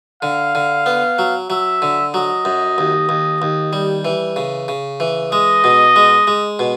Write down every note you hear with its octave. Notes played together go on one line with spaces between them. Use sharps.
D3 F5
D3
B3
F#3
F#3 E5
D3
F#3 D#5
F#2
D#2
D#2
D#2
G3
E3
C#3
C#3
E3
G#3 D#5
B2
G#3
G#3
B2